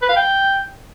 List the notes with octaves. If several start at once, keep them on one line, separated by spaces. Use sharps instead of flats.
B4
F5
G5